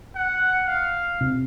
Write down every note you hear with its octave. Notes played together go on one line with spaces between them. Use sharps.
F#5
F5
C3